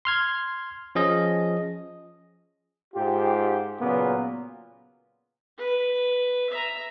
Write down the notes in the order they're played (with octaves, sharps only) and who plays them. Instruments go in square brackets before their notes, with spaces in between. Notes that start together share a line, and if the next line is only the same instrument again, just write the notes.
[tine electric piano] C6 F6 G#6
F3 C#4 G#4 D#5
[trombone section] G#2 F4 G4
A#2 C#3 F#3 A#3 B3
[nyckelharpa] B4
E5 A#5